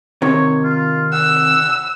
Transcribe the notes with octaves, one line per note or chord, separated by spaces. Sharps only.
C3 D#3 C#5
F4
F#5 E6